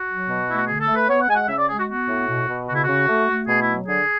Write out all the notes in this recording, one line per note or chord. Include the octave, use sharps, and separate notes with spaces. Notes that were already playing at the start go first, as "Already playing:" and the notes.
Already playing: F#4
F#3
B2
A3 E4
F#4
D3 G#4
A4
A3
B4
B3 C#5
F#5
G#3 G#5
F#5
C#3 E5
D5
G#3 G#4
F#4
B3 F#4
A2
B2
B2
C#3 F#4
E4
C#3 F#4
A3
A3
B2 G#4
E4
F#3
D3 G#4